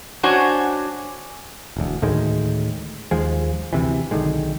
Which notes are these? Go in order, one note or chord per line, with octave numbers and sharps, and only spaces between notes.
C#4 D4 F#4 C5 C#5 G#5
E1 D2
D2 A2 D#3 G#3
D#2 F3 G#3
D2 C3 E3
B1 D3 D#3 G#3